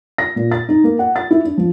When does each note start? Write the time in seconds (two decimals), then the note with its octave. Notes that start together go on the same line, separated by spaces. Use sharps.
0.18 A#6
0.36 A#2
0.52 A6
0.69 D#4
0.84 A#3
0.99 F#5
1.16 A6
1.31 E4
1.45 D4
1.58 F3